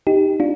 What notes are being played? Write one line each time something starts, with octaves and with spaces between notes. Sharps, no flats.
D#4 G4
D4 F4